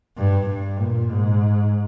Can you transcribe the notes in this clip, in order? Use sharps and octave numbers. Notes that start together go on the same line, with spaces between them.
G2
G2
A#2
G#2